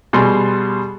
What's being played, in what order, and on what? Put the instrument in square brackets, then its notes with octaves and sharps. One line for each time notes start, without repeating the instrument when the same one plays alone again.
[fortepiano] B2 G3 G#4 C6